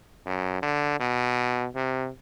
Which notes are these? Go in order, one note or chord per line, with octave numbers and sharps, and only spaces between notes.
F#2
D3
B2
C3